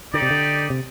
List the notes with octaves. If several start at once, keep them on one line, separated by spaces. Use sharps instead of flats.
D3 D#4 G4 D5
C3
D3
C3